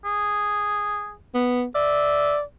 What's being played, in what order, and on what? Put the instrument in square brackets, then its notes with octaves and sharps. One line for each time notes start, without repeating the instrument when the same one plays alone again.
[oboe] G#4
[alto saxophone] B3
[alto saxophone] D5 [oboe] E5